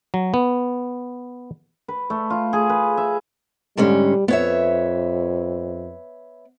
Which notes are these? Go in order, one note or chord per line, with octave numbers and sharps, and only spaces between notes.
F#3
B3
B4
A3
F4
G#4
B4
E5
G#2 D3 G3 C#4
F2 B3 C#5 E5